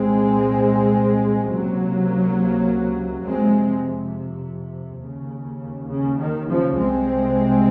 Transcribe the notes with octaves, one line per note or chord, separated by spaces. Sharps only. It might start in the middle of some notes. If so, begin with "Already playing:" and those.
Already playing: C2 A#2 G#3 C4
C#2 C3 F#3 A#3
F2 C3 G#3 C4
D#2 C#3
C#3
D#3
C#3 F3
C2 C3 G#3 C4